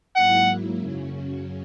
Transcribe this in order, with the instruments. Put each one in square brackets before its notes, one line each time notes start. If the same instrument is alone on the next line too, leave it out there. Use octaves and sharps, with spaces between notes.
[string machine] G#2 F#3 A#3 E4 [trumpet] F#5
[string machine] F#2 C#3 F#3 C#4